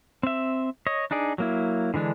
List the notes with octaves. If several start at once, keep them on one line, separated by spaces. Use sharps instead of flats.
C4 E5
C#5 D#5
D4 D#4 G#4 D5
F#3 A#3 E4
D3 E3 G#3 D4